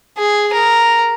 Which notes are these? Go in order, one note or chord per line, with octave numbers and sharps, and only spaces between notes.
G#4
A#4